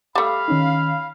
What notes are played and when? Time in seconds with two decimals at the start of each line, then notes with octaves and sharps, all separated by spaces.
0.15 G3 A3 F5 B5
0.48 D#3 C#4 D#4